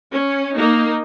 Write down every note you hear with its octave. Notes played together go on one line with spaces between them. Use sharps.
C#4
A#3 D#4